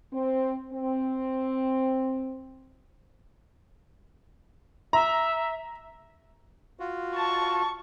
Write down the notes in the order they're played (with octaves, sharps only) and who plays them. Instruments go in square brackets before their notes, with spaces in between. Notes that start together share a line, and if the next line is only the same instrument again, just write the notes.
[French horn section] C4
C4
[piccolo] E5 [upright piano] A#5
[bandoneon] F4 F#4
[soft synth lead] A5 [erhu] C#6